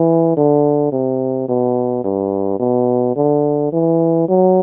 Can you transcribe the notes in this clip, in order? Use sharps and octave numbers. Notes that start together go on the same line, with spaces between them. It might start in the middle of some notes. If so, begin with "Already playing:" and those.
Already playing: E3
D3
C3
B2
G2
B2
D3
E3
F#3